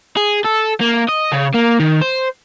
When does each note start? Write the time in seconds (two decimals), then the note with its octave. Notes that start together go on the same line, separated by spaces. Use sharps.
0.17 G#4
0.45 A4
0.81 A#3
1.09 D#5
1.32 C#3
1.54 A#3
1.80 D#3
2.01 C5